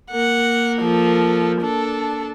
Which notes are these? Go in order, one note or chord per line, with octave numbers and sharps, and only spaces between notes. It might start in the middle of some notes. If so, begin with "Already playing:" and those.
A#3 A#4 F#5
F3 A4
D4 A4